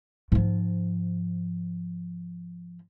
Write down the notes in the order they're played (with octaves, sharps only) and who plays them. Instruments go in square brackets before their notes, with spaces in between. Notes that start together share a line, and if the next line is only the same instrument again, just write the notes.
[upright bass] G#2 F3